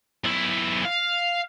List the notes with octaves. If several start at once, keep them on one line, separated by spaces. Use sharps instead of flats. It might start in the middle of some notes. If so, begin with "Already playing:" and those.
B1 E4
F5